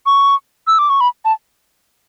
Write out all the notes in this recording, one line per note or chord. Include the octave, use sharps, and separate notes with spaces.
C#6
E6
D6
C#6
B5
A5